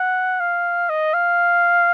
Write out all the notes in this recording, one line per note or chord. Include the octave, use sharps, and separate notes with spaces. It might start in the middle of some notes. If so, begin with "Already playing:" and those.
Already playing: F#5
F5
D#5
F5